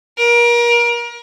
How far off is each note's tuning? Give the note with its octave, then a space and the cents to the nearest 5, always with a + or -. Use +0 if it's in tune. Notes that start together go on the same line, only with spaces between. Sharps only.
A#4 +30